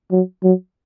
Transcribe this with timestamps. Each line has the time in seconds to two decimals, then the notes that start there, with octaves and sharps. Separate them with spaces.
0.12 F#3
0.43 F#3